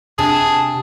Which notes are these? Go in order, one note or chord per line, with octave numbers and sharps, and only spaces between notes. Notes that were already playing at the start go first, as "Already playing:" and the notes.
C3 D4 G#4 A5